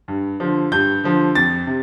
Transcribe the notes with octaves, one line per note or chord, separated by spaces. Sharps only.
G2
D3 F3
G2 G6
D3 F3
F2 A6
C3